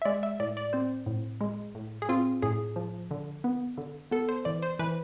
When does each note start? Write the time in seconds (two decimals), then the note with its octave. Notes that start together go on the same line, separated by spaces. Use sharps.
0.02 E5
0.05 G#3 D5
0.23 E5
0.40 A2 D5
0.57 D5
0.73 C4 C5
1.06 A2
1.41 G#3
1.75 A2
2.02 G#4
2.09 C4 F4
2.42 A2 G#4
2.76 F3
3.11 D3
3.44 B3
3.78 D3
4.11 B3 A4
4.29 C5
4.45 E3 D5
4.63 C5
4.79 E3 B4